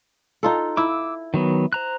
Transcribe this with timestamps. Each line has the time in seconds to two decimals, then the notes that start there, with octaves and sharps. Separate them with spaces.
0.43 D#4 F4 A4
0.77 E4 D6 E6
1.34 D#3 F#3 B3
1.73 C5 A#5 F#6